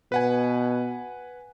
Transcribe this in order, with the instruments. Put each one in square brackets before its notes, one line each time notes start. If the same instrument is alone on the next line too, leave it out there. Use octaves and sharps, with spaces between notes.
[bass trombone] B2 [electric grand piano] B4 F#5 G#5